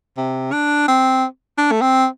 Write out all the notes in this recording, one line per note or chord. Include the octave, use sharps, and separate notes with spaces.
C3
D4
C4
D4
A3
C4